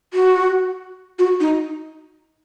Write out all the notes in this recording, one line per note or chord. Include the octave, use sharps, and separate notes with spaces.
F#4
F#4
D#4